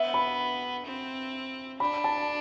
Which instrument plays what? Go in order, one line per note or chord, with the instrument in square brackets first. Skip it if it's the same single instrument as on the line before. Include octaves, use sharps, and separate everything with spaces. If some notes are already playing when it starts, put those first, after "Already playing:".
Already playing: [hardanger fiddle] B3 [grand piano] E5
[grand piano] B5
[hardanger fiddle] C4
[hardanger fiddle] D4 [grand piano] B5
[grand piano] A5